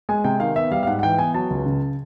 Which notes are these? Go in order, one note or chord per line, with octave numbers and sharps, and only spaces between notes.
G#3 G#5
C3 G5
D#3 F5
B3 E5
G3 F5
F5
G#2 F#5
F#5
E3 G5
B3 G#5
F#3 A5
C#2
C#3